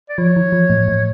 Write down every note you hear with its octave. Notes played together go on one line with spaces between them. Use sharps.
D5
F3 C#5
E3
F3
A2
A2